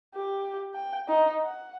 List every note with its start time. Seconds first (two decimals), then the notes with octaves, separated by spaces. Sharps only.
0.15 G4
0.74 G5
1.08 D#4
1.43 F#5